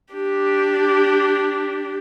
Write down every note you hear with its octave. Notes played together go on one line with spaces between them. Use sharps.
D4 G4